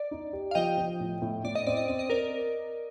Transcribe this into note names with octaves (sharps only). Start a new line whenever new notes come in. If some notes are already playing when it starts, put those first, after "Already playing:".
Already playing: D5
D#4
G4
F5
F3 D#5 G5
F3
A2
A2
A2 D5
D#5
C4 D5
D#5
C4 D5
D#5
C4 A#4 D5